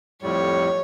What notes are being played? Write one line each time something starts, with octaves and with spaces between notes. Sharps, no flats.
F2 A2 G3 C#5